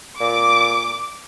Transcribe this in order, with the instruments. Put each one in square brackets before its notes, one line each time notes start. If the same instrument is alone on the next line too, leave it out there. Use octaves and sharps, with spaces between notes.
[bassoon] A#2 [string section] D6